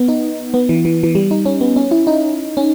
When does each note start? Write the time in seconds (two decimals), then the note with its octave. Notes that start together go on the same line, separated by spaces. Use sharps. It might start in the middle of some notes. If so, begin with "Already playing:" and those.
Already playing: B3
0.08 D#4
0.54 B3
0.69 E3
0.85 E3
1.03 E3
1.15 G3
1.31 D#4
1.45 C#4
1.61 B3
1.76 C#4
1.91 E4
2.07 D#4
2.57 C#4